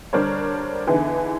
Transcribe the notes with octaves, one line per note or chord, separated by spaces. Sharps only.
D3 G3 D4 A#4 C5 C#5
D3 E3 B3 D#4 E4 G#4